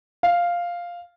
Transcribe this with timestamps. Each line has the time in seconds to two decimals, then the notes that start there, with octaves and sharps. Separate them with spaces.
0.23 F5